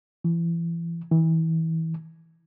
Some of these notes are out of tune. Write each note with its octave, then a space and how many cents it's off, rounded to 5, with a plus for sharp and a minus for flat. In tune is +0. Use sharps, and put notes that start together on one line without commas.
E3 +30
E3 -30